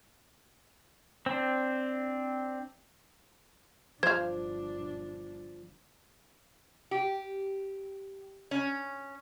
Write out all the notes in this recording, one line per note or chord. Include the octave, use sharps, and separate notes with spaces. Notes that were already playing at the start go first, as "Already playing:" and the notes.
C4 D4
G1 F3 D4 C5 F5 G#6
G4
C#4